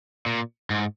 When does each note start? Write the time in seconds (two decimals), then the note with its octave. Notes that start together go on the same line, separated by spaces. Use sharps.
0.26 A#2
0.70 G#2